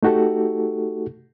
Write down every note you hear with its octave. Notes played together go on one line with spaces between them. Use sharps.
A3 D#4 F#4 G4 A4